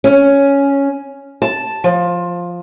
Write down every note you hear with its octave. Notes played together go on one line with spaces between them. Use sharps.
C#4
A5
F3